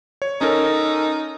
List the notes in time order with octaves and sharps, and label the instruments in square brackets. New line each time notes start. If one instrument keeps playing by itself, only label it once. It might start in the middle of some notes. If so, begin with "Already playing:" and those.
[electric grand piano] C#5
[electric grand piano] C#4 A4 A#4 [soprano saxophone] D#4